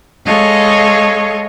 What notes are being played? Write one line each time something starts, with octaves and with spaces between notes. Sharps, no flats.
G#3 A4 C#5 D#5 F5